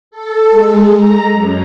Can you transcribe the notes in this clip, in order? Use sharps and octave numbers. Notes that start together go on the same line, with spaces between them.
A4
G#3
A#5
F#2